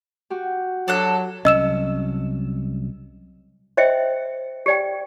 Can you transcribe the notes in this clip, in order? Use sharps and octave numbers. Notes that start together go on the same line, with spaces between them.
F#4 G4
F#3 D4 A4 F#6
C2 F#3 C#4 D#5 E6 E7
C5 D#5 E5 G5
G4 D5 G5